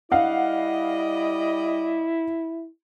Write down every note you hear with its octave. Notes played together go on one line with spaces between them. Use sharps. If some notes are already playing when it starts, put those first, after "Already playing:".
G3 E4 D5 D#5 F5 F#5